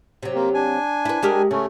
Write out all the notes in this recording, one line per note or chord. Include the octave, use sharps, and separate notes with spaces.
C3 F#3
A#3 C4
D4 G#5
E4 B4
G#3 G4 A#4
C#3 A3 C#4